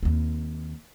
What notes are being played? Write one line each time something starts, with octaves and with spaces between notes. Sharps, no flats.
D#2 C4